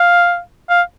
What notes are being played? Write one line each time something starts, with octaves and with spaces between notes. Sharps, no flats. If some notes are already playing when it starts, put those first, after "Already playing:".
Already playing: F5
F5